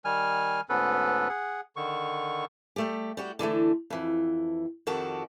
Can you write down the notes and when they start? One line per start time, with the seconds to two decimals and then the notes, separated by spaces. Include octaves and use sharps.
0.05 D#3 G3 G#5 F6
0.69 D2 G#2 B3 C#4 A4 B4
1.29 G#4 F#5
1.76 D3 D#3 C#6
2.76 G3 A3 G4
3.17 G3 F#4 G4
3.39 D3 E3 G3 A3
3.90 F2 E3
4.87 F2 D#3 F#4 G4 A4